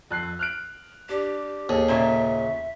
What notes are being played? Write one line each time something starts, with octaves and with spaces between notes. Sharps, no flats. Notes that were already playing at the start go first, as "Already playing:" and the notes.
F2 F#6 C7
F6 F#6 D7
D4 G4
D#2 G#4 A4
A#2 C#3 E5